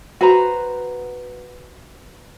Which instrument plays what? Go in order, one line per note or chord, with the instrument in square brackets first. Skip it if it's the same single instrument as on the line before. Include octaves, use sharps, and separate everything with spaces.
[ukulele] F#4 B4 C5 A#5